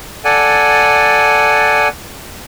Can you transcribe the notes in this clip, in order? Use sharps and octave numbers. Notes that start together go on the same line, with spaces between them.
A4 D5 F#5 G#5